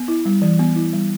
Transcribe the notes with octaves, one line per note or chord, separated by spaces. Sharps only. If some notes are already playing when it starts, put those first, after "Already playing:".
Already playing: B3
E4
G3
E3
B3
E4
G3